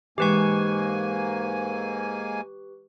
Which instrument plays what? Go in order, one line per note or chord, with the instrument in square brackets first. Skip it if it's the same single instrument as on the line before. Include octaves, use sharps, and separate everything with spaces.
[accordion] G#2 A#3 G#5 [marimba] E3 G#3 [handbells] G4 B4 C#6